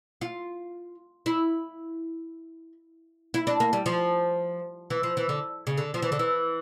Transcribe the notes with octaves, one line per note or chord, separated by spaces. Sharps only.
F4
E4
E4
D4
A#3
G3
F3
E3
F3
E3
D3
C#3
D3
F3
E3
D3
E3